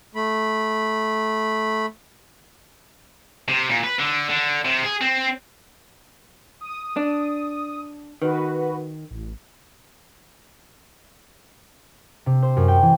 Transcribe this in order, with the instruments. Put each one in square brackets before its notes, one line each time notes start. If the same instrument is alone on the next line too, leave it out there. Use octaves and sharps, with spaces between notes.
[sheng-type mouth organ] A3 B5
[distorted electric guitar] C3
A#2
B4
D3
D3
C3
G#4
C4
[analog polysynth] D#6
[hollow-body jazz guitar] D4
[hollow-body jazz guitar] D#3 [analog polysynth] F#4 B4
[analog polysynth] A1
[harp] C3
C5
F#2
G5
E3